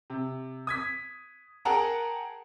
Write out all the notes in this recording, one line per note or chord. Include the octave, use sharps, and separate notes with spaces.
C3
D#6 G#6 B6
G#4 A#4 F#5 G5 A5 A#5